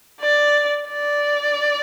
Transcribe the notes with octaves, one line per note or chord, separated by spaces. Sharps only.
D5
D5